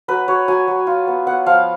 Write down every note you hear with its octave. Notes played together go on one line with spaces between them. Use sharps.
F#3 B4
F#3 C#5
F#3 G#5
F#3
F4
B3
B3 F#5
F3 F5